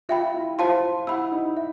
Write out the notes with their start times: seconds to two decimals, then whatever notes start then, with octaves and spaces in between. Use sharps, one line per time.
0.09 F4 E5 G5 B5
0.34 E4
0.58 F4 C5 F5 A5 C6
1.07 E4 F#5 B5 E6
1.32 D#4
1.57 E5